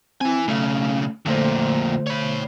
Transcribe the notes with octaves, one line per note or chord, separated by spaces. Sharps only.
C4 E4 G#5
B1 C#3 A3
F2 A#2 D3 A3 C5
C#5 B5